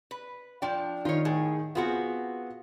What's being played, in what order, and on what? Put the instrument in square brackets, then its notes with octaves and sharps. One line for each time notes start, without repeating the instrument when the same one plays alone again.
[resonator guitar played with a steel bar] B4
[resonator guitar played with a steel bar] F3 D4 [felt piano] G5
[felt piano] D#3 [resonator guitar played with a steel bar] F4 C#5
[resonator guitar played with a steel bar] A2 G#4
[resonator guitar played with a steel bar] B3 C4 F#4 [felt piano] F4 G#4